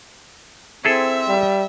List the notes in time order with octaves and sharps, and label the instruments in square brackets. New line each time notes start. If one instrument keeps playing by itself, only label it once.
[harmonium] C4 [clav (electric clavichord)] E4 G#4 A4 [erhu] E5
[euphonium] G3